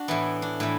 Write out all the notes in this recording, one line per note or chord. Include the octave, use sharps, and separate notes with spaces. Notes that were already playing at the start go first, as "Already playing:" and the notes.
Already playing: D4 F#4
A2 E3 B3
D4
A2 E3